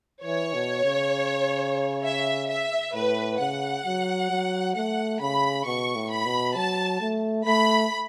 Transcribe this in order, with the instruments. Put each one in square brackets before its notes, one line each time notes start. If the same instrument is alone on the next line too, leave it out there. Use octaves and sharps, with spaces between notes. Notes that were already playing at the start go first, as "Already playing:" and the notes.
[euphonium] E3 [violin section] C#5
[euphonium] B2
C#3
[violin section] E5
E5
[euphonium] A2 [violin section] B4
[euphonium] C#3 [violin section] F#5
[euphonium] F#3
F#3
[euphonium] A3 [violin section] F#5
[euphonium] C#3 [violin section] B5
[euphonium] B2 [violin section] C#6
[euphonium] A2
[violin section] B5
[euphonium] B2
[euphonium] F#3 [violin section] A5
[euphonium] A3
[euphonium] A3 [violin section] B5